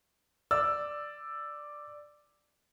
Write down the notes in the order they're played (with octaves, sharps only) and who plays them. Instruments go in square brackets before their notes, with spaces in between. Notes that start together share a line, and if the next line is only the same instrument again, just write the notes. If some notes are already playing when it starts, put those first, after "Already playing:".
[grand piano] D5 E6